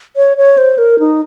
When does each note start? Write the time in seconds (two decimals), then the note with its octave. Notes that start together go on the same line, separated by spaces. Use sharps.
0.17 C#5
0.37 C#5
0.58 C5
0.78 A#4
0.99 D#4